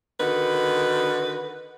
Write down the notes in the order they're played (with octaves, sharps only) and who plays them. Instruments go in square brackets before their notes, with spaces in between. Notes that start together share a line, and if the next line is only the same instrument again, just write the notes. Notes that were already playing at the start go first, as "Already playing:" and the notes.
[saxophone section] D3 D#3 F#4 B4